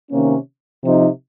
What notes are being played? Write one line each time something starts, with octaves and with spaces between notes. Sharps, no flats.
C3 D#3 A#3 C#4
C3 F3 C4 D#4